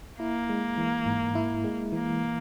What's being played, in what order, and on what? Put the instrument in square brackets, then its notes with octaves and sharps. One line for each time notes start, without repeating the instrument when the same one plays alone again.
[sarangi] A#3 [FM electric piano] E4
[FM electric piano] G#3
E3
G#2
E4
G#3
[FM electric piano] E3 [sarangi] A#3